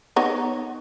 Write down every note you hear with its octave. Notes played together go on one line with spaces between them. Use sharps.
B3 D#4 C#5